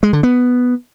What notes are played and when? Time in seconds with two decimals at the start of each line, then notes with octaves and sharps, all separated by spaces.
0.03 G#3
0.13 D3
0.23 B3